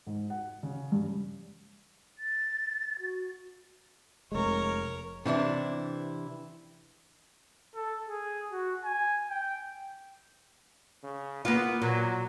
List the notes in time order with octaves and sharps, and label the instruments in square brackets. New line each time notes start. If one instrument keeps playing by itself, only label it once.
[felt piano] G#2
F#5
C#3
G2
[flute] A6
F#4
[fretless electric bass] F1 G#3 [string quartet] A#4 C#5
[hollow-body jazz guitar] C3 E3 D4 E4
[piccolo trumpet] A4
G#4
F#4
G#5
G5
[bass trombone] C#3
[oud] A#3 F4 [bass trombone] B3
[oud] A#2 [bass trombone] F#3